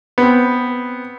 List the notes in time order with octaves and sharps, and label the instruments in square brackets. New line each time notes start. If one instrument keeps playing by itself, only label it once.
[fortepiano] B3 C4